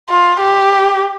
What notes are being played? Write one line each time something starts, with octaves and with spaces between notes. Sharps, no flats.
F4
G4